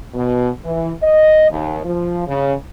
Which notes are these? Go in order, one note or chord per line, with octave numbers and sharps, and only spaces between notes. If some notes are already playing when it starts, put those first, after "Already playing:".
B2
E3
D#5
D#2
F3
C#3